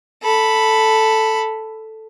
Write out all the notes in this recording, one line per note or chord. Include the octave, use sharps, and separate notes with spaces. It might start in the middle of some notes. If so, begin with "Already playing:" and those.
A4 B5